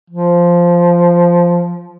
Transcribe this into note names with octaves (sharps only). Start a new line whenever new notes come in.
F3